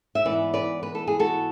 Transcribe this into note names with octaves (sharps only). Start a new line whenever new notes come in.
E5
G#2 E3 B3 B4 D5
B4 D5
B4
A4
G#4
F#4 A4